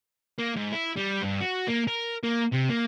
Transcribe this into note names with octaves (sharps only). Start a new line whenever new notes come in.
A#3
G#2
E4
G3
G2
F#4
A#3
A#4
A#3
C3
A#3